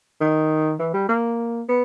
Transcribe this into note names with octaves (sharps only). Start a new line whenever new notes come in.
D#3
E3
G3
A#3
B3